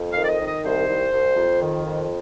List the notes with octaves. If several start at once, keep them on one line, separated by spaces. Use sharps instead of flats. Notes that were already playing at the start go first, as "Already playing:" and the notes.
Already playing: F2
F5
D#3
D5
D#5
D#3
D#5
C2 C5
C2
C2
F2
D#3
F2